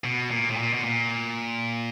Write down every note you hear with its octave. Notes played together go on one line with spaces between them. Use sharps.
B2
A#2
A2
A#2
B2
A#2